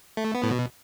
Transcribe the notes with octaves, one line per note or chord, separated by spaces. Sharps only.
A3
B3
A2
B2